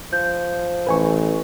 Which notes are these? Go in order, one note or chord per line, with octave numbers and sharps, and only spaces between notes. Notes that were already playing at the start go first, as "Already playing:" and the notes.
F3 G6
A1 B4 G#5 C#6